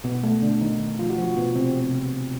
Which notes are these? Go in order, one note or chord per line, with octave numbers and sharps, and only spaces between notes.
B2 B3
A3
D3 D4
D#3 D#4
F3 F4
F#4
F3 F4
B2 B3
C3 C4
C3 C4